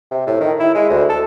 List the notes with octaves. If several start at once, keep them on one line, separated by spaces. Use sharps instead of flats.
C3
A2
D#3
E4
G#3
D2
A4